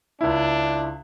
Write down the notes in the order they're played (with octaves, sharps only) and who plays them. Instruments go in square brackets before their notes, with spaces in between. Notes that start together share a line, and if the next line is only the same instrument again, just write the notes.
[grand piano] C#2 E4 [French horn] D4